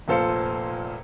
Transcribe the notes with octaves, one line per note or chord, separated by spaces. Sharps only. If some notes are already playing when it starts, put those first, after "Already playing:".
F1 A#2 A4 C5 F5 C#7